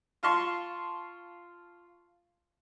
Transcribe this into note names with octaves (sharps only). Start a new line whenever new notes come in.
F4 F5 A5 C6 C#6